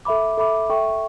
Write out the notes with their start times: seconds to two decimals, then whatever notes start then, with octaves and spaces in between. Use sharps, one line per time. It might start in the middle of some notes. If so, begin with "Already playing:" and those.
0.05 A4 E5 B5 D6
0.38 A4 E5 B5 D6
0.70 A4 E5 G5 C#6